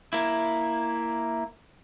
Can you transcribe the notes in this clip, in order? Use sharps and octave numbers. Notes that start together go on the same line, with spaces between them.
A#3 E4